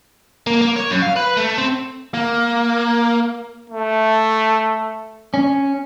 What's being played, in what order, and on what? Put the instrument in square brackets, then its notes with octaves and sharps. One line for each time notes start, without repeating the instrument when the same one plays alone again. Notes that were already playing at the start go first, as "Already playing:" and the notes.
[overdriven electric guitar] A#3
A#3
C#5
F#2
F5
B4
A3
C4
[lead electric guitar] A#3
[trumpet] A3
[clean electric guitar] C#4